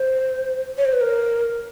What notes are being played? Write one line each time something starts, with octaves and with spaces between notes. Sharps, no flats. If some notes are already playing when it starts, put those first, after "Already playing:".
Already playing: C5
C#5
C5
B4
A#4